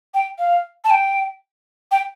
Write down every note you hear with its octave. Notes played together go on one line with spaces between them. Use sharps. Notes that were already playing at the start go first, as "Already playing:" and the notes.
G5
F5
A5
G5
G5